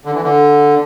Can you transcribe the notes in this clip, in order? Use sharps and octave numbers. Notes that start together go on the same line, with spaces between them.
D3
E3
D3